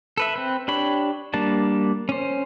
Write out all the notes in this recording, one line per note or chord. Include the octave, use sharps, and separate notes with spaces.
A4 B4 E5
C4 B4
D4 G4 C#5 B5
G3 A#3 D4 A5
C#4 C5